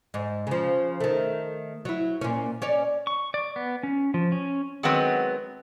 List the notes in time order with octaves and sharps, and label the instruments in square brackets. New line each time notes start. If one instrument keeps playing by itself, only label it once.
[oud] G#2
C#3 F3
D#3 A3
F#3 E4
A#2 C#4
C#4 C#5 D5
[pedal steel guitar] C#6
D5
B3
C#4
F3
C#4
[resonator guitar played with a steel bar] D#3 F#3 G#3 B3 C4